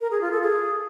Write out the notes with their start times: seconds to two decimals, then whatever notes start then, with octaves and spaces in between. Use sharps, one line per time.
0.01 A#4
0.11 G#4
0.21 F4
0.32 A4
0.42 G#4